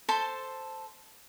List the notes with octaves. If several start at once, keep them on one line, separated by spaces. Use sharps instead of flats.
A4 C5 A5 C6